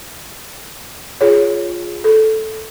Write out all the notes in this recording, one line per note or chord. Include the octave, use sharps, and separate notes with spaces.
F4 G#4 C#5
A4